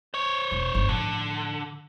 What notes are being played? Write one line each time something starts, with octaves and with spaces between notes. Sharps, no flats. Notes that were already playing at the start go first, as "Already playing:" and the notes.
C5 C#5
E1
G1 A3
A2 D3 F3